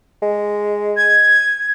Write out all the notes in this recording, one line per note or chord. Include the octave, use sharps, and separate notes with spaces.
G#3
G#6